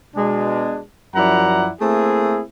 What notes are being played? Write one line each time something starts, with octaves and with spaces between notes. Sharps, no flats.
B2 G#3 D4
F#2 F3 E4 D5 F#5 A#5
A3 A#3 C4 E4 G#4